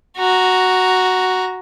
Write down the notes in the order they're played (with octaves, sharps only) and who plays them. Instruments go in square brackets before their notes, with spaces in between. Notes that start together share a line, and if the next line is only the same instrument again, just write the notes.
[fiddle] F#4 A#5